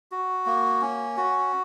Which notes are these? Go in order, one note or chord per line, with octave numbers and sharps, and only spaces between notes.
F#4
A#3
C#4
F#4